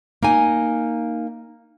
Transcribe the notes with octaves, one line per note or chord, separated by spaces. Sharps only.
A#3 D#4 G#5